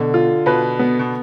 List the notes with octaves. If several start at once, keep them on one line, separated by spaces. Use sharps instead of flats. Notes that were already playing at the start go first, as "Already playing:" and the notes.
Already playing: B2 D3
F4
B2 B4
B3
B2